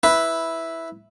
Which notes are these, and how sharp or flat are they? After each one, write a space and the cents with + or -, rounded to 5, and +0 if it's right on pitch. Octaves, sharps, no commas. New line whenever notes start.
E4 -5 B4 +0